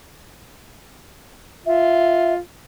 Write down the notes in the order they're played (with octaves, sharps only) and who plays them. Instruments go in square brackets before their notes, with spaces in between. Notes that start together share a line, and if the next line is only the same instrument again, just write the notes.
[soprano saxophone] F4 [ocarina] E5